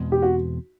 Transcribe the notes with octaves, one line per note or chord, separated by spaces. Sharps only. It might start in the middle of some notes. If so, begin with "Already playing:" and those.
Already playing: E2 B2 G#3 C4
G4
F#4